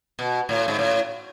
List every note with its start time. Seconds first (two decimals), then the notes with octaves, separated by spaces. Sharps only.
0.19 B2
0.49 A2
0.68 G#2
0.79 A2